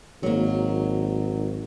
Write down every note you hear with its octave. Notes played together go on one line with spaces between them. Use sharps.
G#1 F#3 A#3